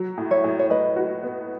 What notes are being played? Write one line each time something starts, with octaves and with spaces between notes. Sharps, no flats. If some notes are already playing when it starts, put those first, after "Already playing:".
Already playing: F#3
A2
C#5 E5
A2
C#5
A2 B4 D#5
F#4
B3